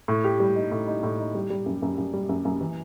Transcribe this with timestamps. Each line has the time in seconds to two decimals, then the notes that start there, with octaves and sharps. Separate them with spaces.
0.08 A2
0.24 G4
0.40 G3
0.56 D#4
0.71 A2
0.87 D#4
1.03 A2
1.19 D#4
1.35 G3
1.50 G3
1.66 F#2
1.82 F#2
1.98 F#2
2.14 G3
2.29 F#2
2.45 F#2
2.61 E3